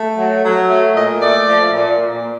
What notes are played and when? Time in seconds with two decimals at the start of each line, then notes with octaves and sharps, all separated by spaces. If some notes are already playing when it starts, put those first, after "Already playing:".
Already playing: A3
0.18 F#3
0.44 F#3
0.69 A3
0.95 A#2 D#5
1.21 A3 D5
1.46 F3
1.73 A#2
1.98 A#2